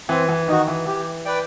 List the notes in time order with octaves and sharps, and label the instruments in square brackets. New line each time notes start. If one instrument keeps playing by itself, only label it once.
[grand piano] E3 [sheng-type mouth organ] C4
[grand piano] E3
[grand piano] D#3 [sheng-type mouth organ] D#4 F#4
[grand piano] E3
[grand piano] E3 [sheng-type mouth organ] G4
[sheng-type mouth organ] B4 D5 G5